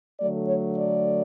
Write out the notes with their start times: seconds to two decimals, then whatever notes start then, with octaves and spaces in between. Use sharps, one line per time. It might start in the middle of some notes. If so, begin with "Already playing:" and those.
0.20 D3 F#3 A3 D5
0.49 C#5
0.78 D5